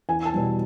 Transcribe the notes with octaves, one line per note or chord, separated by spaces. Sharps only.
E2 G#5
A5
B2 G3